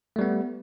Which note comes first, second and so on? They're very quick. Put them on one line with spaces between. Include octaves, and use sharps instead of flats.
A3 G3 B3